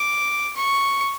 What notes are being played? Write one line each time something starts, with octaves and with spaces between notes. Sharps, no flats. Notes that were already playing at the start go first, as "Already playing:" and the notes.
Already playing: D6
C#6